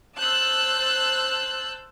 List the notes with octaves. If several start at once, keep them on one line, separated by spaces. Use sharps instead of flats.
C5 A5 E6 F#6 G6